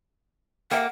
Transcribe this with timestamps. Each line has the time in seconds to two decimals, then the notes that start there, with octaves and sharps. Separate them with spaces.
0.71 A#3 G4 E5 F#5